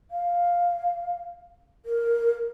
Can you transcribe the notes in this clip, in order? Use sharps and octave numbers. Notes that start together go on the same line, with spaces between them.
F5
A#4